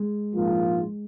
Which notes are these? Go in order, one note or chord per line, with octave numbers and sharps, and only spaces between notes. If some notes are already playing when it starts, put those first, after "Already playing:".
Already playing: G#3
A#1 G#2 F3 A#3 F4